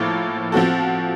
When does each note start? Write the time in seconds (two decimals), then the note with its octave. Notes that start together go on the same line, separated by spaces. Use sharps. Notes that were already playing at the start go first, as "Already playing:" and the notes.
Already playing: A2 F3 A#3
0.52 F3 C4 F#4 A4